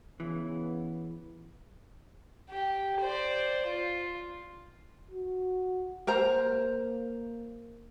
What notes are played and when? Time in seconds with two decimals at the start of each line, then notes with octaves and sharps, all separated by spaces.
0.20 C#3 E3 B3
2.50 G4
3.00 C5 D5
3.67 F4
5.11 F#4
6.07 A#3 A#4 C5 A#5